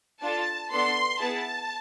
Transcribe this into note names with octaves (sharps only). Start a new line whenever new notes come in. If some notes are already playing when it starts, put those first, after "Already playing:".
D4 F4 A4 A5
B3 D4 A4 C6
B3 E4 G#4 A5